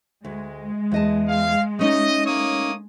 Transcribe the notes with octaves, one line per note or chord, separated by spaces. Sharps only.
D2 G#3
E2 D#5 A5
F5
A3 C#4 D#4 D#5
A#3 C#5 D#6